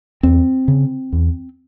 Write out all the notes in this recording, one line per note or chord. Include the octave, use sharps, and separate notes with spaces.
E2 C4
C#3
E2